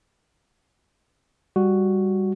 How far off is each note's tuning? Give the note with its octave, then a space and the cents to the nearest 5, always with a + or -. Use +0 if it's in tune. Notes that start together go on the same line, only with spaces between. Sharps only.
G3 +10 F#4 +0